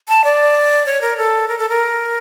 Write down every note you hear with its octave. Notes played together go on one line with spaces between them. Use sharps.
A5
D5
C#5
A#4
A4
A#4
A4
A#4